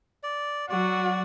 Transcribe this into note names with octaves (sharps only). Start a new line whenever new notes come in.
D5
F#3 F#4 D5